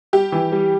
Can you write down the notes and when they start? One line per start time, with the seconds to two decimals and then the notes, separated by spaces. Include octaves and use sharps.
0.13 G3 G4
0.32 E3
0.52 G3